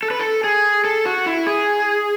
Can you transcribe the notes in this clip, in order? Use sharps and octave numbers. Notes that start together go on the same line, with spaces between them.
A4
B4
A4
G#4
A4
F#4
E4
G#4